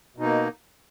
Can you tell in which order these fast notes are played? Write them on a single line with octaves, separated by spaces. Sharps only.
B2 D#4 A#3